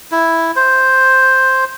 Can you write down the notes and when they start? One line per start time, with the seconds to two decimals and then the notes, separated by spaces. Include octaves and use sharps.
0.12 E4
0.56 C5